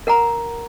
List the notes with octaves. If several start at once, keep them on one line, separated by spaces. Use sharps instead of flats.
A#4 F#5 A#5